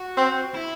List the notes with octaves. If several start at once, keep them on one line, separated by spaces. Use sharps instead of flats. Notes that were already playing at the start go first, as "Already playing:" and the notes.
Already playing: F#4
C4
E4